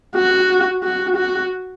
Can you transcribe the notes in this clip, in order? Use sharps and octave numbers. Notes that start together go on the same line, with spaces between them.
F#4
F#4
F#4